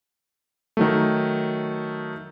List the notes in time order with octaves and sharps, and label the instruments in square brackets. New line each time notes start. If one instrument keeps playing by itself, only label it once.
[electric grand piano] D#3 F#3 A3